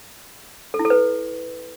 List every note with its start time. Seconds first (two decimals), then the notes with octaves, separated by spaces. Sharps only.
0.74 A4
0.79 E4
0.85 A4
0.90 B4